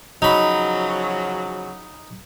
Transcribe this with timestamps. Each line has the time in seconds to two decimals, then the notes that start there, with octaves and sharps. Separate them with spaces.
0.22 C#3 F3 F#3 D#4 B5